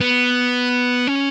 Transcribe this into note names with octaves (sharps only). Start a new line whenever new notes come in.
B3
C#4